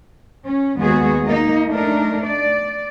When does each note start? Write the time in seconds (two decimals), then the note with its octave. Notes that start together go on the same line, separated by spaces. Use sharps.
0.45 C#4
0.78 D#2 G#3 B3 F#4 G#4
1.26 A#3 D#4 D#5
1.67 A3 D4 D#4 A#4
2.23 D5